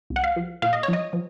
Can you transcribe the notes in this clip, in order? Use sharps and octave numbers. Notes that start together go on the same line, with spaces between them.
C2
F#5
F5
F3
A#2 F5
D#5
C#5
F3 D#5
F3